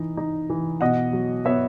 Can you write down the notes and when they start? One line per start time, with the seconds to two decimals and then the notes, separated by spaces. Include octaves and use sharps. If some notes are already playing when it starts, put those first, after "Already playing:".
Already playing: E3 D#4
0.17 D#4
0.50 E3
0.81 B2 D#5 F#5
1.13 F#3
1.45 B3 C#5 E5